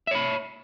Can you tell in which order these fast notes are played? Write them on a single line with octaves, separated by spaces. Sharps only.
E5 C#5 B5